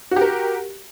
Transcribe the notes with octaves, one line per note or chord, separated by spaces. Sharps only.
F#4 G4 A#4